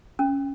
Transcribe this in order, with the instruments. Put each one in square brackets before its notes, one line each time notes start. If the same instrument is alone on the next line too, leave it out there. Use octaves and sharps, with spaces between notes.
[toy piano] C#4